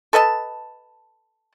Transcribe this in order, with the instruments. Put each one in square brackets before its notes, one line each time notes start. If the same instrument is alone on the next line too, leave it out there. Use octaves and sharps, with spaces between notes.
[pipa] A4 B4 D#5 A5